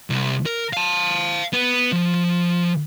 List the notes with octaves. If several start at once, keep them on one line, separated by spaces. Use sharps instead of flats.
C2
A#4
F5 A5
B3
F3